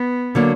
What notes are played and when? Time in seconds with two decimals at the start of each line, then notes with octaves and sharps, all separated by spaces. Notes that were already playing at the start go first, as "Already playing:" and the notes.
Already playing: B3
0.35 D3 F#3 A#3